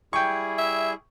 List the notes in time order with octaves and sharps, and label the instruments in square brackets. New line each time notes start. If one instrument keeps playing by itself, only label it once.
[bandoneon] G3 E4 G#4 [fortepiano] G5 C#6
[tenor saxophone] E5